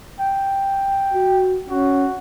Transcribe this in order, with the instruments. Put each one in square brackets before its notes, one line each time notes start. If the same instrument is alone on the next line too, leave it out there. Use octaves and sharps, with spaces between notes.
[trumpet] G5
[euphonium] F#4
[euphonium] C#4 [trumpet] F#4